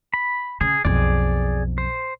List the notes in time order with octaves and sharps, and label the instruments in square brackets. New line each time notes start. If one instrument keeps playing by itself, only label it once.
[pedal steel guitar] B5
[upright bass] C#3 [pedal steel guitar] G#4
[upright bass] B1 F2 [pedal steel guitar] G#4 D5
[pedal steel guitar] C5